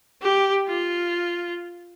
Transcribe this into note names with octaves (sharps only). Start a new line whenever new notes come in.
G4
F4